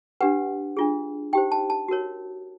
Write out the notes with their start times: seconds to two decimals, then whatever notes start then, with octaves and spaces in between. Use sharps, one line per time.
0.21 D4 G4 B4 F#5
0.77 D4 F4 G#4
1.33 D#4 G4 C5 G5
1.52 A5
1.70 A5
1.88 F#4 A#4 C#5